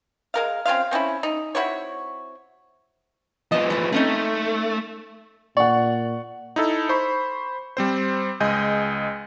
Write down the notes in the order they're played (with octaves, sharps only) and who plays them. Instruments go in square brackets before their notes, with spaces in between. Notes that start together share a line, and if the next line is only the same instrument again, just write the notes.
[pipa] G#3 A#4 F5
C4 C#4 F4 F5
C4 C#4 D#4 E4
D#4
C4 E4 F#4 C#5
[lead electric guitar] F3 B3 [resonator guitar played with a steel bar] D#5
[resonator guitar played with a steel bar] E3 A3
[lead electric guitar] A3 [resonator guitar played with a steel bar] C4 C#4 D#4
[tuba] A#2 [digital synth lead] D5 [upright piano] F#5 C#6
[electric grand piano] D#4 E4 A4
C5 B5 C#6
G3 C4 C5
C#2 G#3 D#5 G#5 G6